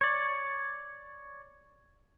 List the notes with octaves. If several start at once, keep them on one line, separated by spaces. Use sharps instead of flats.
C#5 D5